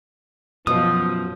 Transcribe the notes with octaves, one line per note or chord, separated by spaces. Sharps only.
F#2 B2 F3 D#6